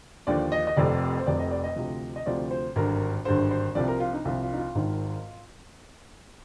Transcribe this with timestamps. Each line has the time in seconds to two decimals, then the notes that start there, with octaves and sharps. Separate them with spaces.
0.27 D#2 D3 F3 D5
0.52 D#5
0.67 D#5
0.77 F1 F2 C3 D5
1.20 C5
1.26 F1 F2 C3 D5
1.39 D#5
1.51 D5
1.64 D#5
1.76 D2 C3 F3
2.16 D#5
2.26 D2 C3 F3 D5
2.51 C5
2.76 G#1 G2 D3 A#4
3.25 G#1 G2 D3 C5
3.51 C5
3.75 C2 C3 F3 D5
3.88 A#4
4.00 F4
4.13 D#4
4.25 C2 C3 F3 F4
4.42 F4
4.52 D#4
4.58 F4
4.75 G#1 G#2 D#3